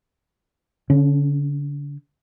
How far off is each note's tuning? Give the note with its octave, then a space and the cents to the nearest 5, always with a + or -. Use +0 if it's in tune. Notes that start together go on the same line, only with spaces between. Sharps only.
D3 -35 C#4 +0